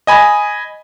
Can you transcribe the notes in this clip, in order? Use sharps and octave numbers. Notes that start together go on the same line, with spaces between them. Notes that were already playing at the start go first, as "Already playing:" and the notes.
D#5 G#5 B5